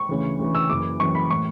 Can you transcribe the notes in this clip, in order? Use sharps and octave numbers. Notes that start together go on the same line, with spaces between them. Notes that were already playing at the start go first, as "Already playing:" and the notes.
Already playing: C#6
D2 C#3 E3
D2 C#3 E3
E6
F#1 F#2 E3 D6
F#1 F#2 E3 C#6
B5
A2 E3 C#6